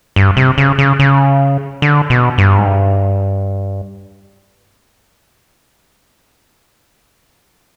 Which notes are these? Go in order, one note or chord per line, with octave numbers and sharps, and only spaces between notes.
G2
C3
C#3
C#3
C#3
D3
B2
G2
G#2
G2